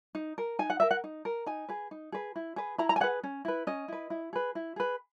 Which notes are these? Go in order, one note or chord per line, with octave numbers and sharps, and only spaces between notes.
D#4
A#4
D#4 G#5
F#5
A#4 E5
F#5
D#4
A#4
D#4 G#5
G#4 B4
D#4
G#4 B4
E4
G#4 B4
E4 A#5
A#5
G#5
G#4 B4 F#5
C#4
E4 B4
C#4 D#5
E4 B4
E4
G#4 B4
E4
G#4 B4